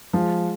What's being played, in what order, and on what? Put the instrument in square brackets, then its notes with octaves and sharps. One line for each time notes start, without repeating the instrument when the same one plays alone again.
[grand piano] F3 [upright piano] G#3